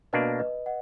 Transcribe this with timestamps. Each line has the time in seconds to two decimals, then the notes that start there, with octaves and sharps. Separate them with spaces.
0.13 B2 A#3 D4 B4 D#5
0.39 B4 D#5
0.66 D#5 F#5